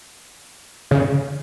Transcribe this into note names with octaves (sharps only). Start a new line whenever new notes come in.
C#3